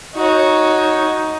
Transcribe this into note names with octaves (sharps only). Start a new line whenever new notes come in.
D#4 F#4 C#5